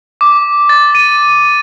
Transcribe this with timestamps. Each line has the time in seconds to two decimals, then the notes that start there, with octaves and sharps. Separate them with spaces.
0.21 D6
0.69 A6
0.95 D#7